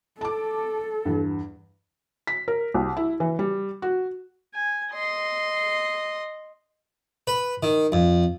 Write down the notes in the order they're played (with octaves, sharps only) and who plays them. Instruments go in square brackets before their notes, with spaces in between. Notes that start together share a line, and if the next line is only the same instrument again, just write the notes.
[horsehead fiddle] A4 [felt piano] A5 D6
[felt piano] E2 G2
B6
A#4
C2
E4
E3
G3
F#4
[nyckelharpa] G#5
D#5 C6
[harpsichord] B4
D#3
F2